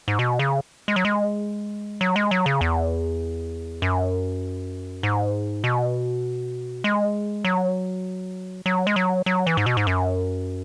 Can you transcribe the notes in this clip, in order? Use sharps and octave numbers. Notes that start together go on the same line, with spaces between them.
G#2
B2
C#3
G#3
F#3
G#3
F#3
G#3
F#3
C#3
E2
F#2
G#2
B2
G#3
F#3
F#3
G#3
F#3
F#3
E3
G#2
B2
G#2
F#2